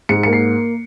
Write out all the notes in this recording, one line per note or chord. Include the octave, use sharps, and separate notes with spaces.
G#2 C#7
A#3 C#7
C7